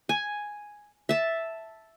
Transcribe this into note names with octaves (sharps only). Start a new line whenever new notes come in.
G#5
E5 A5